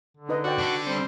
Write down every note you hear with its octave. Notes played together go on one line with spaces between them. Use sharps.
D3
D#4 B4 D#5
F#4 D5 G5
D4 A4
G3 C4